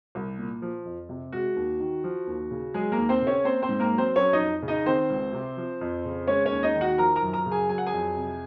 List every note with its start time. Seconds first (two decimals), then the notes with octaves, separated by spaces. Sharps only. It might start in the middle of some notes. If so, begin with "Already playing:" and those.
0.15 C2
0.39 A#2
0.62 F3
0.85 F2
1.09 C3
1.32 G#3 F#4
1.56 D#2
1.80 D#3
2.04 F3
2.27 D#2
2.51 C#3
2.74 F#3 G#3 G#4
2.92 A#3 A#4
2.98 D#2
3.09 C4 C5
3.22 C#3
3.27 C#4 C#5
3.44 A#3 C4 C5
3.62 C4 C5
3.69 G#2
3.80 A#3 A#4
3.92 F#3
3.98 C4 C5
4.16 F#3 C#4 C#5
4.33 D#4 D#5
4.39 F2
4.62 C#3
4.68 D#4 D#5
4.86 D#3 C4 C5
5.10 C#2
5.33 C3
5.57 F3
5.81 F2
6.05 C#3
6.27 G#3 C#4 C#5
6.46 C#4 C#5
6.51 D#2
6.63 D#4 D#5
6.75 D#3
6.81 F#4 F#5
6.98 F3 A#4 A#5
7.16 A#4 A#5
7.22 F#2
7.33 A#4 A#5
7.46 C#3
7.51 G#4 G#5
7.69 F#3 G#5
7.78 F#5
7.86 G#4 G#5
7.93 F2
8.16 C3